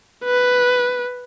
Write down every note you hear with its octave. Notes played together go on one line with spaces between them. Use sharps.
B4